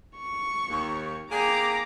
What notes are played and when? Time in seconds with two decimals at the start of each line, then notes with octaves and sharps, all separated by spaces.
0.18 C#6
0.69 D#2
1.31 A#3 G4 G#4 A#5 D6